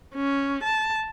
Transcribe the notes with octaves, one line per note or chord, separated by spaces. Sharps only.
C#4
A5